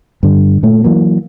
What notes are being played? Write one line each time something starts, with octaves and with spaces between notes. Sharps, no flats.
G2 D3
A#2 A3
E3 F#3 A#3